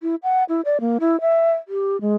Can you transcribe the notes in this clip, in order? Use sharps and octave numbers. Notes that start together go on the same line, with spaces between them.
E4
F#5
E4
D5
A#3
E4
E5
G4
G#3